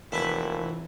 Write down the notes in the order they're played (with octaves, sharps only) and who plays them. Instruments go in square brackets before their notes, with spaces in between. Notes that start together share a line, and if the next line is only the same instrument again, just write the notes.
[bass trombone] F1 [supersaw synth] E3 [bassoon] A#3 [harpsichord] E4 B4